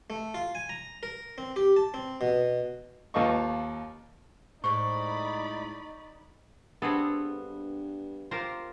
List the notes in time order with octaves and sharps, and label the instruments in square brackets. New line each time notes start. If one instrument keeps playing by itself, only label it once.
[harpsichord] A3
F4
G#5
A#5
A#4
C4
G4
A5
C4
B2
[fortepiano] D#2 F4 A4 B4 D#5 C#6
[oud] A2 G#3 C5 [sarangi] D#4 [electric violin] D5 B5 [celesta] C#6
[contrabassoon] G2 [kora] B3 [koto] C4 G#4 A4 [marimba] D4
[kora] F4 [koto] G4 A#4 C5